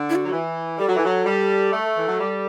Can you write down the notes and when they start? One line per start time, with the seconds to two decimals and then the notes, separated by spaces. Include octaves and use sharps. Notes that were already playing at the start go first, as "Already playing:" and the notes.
Already playing: D3
0.09 E4
0.15 F#4
0.25 F#3
0.31 E3
0.78 G3 A4
0.87 F#3
0.96 E3
1.04 F#3
1.25 G3
1.72 A3
1.96 E3
2.07 F#3
2.20 G3